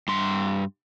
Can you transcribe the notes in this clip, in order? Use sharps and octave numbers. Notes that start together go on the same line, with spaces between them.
G2 C6